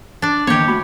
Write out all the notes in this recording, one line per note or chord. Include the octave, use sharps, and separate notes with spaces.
D4 D5
D#3 A#3 B3 G4 C#5
A3 F#4 B5